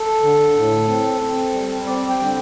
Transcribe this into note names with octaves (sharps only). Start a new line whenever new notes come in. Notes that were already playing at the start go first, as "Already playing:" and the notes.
Already playing: A4
D3
A2
C4
C4
G3
C4 D5
G5
D3